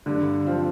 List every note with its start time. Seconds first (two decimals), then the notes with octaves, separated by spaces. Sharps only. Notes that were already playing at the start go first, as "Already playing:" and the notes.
0.06 G2 D3
0.46 F3 C4 F4